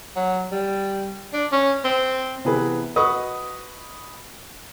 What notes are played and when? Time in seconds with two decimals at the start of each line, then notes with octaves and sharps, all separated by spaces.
0.16 F#3
0.52 G3
1.33 D4
1.52 C#4
1.85 C4
2.45 C3 E3 B3 G#4 B4
2.96 F#4 B4 D#5 C#6 D#6